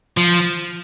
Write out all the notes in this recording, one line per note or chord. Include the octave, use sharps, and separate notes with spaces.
F3